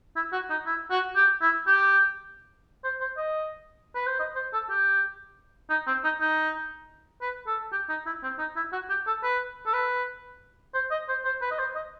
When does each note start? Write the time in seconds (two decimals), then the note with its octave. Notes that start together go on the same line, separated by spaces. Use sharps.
0.16 E4
0.32 F#4
0.50 D#4
0.66 E4
0.90 F#4
1.16 G4
1.42 E4
1.67 G4
2.84 C5
3.01 C5
3.17 D#5
3.95 B4
4.07 C5
4.19 D#5
4.35 C5
4.53 A4
4.70 G4
5.70 D#4
5.87 C4
6.04 D#4
6.21 D#4
7.21 B4
7.47 A4
7.72 G4
7.89 D#4
8.06 E4
8.23 C4
8.39 D#4
8.56 E4
8.72 F#4
8.89 G4
9.07 A4
9.23 B4
9.66 A4
9.73 B4
10.74 C5
10.91 D#5
11.09 C5
11.25 C5
11.41 B4
11.51 D#5
11.59 C5
11.75 D#5